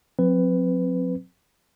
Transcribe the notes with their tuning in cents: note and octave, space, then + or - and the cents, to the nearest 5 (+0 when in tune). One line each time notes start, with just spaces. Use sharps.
F#3 -40 C4 +0 B4 +15